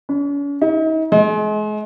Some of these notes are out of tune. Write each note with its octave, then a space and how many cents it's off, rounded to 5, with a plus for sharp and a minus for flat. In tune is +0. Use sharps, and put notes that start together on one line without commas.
C#4 +45
D#4 +40
G#3 +35